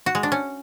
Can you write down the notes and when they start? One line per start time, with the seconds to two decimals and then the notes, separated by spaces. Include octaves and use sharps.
0.06 F#4
0.15 G#3
0.23 D4
0.32 C#4